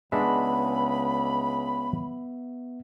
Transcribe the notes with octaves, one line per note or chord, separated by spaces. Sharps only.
C#2 G#3 B3 D4 E5 B5